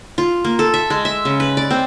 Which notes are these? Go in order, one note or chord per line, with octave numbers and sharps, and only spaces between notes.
F4
A#3
A4
E5
G#3
E5
C#3
B4
D5
C4